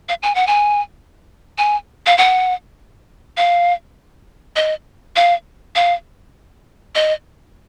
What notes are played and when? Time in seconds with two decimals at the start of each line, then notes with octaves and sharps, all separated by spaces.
0.09 F5
0.23 G#5
0.35 F#5
0.47 G#5
1.58 G#5
2.06 F5
2.18 F#5
3.37 F5
4.56 D#5
5.16 F5
5.75 F5
6.95 D#5